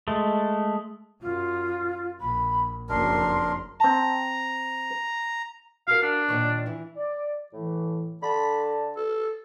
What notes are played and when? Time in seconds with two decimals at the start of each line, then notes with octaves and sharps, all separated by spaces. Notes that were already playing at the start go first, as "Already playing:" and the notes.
0.08 G#3 A3
1.21 F#2 F4
2.20 A#1 B5
2.89 F#1 F2 D4 A#4 C6
3.80 C4 A5 A#5
5.87 F#4 A#4 F5
6.02 D4
6.28 A#2 D#3 C#5
6.66 E3 E4
6.95 D5
7.53 A2 E3
8.23 D3 A5 B5
8.96 A4